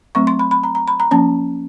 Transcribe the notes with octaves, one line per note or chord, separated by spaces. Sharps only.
F#3 A3 C4 C#6
C6
B5
B5
A#5
A#5
B5
A#5
F3 A#3 C#4 A5